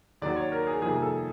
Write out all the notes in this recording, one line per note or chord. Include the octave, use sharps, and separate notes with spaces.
D#2 D#3 F#3 D5
C#5
A#4
G#4
F2 C3 D#3 G3 A#3 G#4
G#4
A4